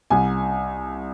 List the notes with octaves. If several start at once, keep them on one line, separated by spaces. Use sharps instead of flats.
C2 G#5